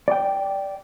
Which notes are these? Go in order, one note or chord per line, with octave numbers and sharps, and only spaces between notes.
D5 G5